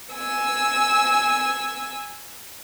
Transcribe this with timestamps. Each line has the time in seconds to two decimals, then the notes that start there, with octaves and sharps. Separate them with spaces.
0.13 G#5 E6